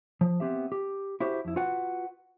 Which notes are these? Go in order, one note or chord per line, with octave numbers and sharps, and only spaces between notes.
F3
B3 C4 G4 E5
G4
E4 F#4 G4 C5
F2 E4
F4 F#4 B4 F#5